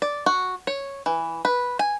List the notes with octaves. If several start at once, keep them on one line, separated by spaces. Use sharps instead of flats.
D5
F#4
C#5
E3
B4
G#5